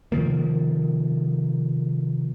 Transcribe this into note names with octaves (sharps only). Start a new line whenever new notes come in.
C3 D#3 F3 A#3